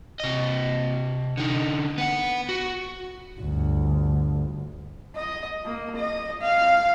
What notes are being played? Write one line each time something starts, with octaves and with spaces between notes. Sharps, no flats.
C3 D#5
D3 D#4
B3 F#5
F#4
G1 D2
D#5
A#3
D#5
F5